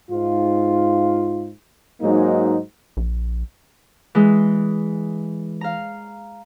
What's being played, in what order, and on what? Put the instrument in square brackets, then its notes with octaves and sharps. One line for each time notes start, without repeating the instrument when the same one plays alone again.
[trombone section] G#2 F4
G#2 F#3 G#3 A#3 D#4
[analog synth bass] A#1
[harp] E3 G#3
F5 A#5